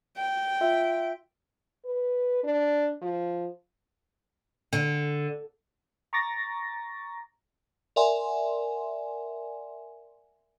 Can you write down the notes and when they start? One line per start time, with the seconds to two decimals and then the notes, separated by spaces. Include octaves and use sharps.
0.17 G5
0.61 F4 E5
1.85 B4
2.43 D4
3.01 F3
4.73 D3
6.13 A#5 C#6 D6 A6 A#6
7.96 A#4 D5 E5 F#5 G#5 C6